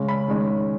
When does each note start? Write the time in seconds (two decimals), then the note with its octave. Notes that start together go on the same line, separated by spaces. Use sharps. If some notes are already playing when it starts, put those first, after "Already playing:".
Already playing: C#3 G#3 C#4
0.08 B5
0.28 D#3 G#3 C#4